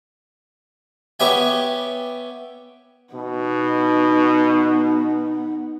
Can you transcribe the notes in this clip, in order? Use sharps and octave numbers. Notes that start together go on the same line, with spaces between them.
B3 G4 C#5 E5 G5 G#5
B2 B3 D#4